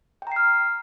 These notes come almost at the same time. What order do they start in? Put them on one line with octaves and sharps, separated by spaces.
G5 A#5 C7 F6